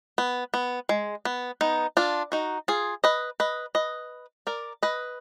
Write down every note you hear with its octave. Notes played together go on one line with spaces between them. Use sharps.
B3
B3
G#3
B3
B3 D#4
D4 F4
D#4 F#4
F4 G#4
B4 D#5
B4 D#5
B4 D#5
A#4 D5
B4 D#5